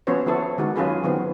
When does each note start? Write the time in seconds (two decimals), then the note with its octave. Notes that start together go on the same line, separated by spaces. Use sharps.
0.07 F3 B3 C#4 F#4 C5 C#5
0.26 F3 B3 E4 A4
0.58 D#3 G#3 F#4
0.76 F#3 C#4 F4 G#4 B4
1.04 D#3 F#3 B3 C4